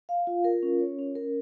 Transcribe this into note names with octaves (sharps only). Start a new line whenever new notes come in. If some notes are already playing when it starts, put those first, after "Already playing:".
F5
F4
A#4
C#4
C#5
C#4
A#4